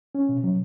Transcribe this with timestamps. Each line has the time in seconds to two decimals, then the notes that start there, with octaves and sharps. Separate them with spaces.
0.15 C#4
0.29 B2
0.44 F#3